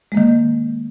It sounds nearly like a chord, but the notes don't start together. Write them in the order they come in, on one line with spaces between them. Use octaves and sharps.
G#3 A#3 D#3